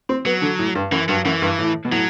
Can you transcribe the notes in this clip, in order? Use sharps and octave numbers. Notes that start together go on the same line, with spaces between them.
C4
F#3 B3
D3
A2
G2
F#2 E3
G2 F#3
F#2 E3
G2
A2
B2
A2 F#3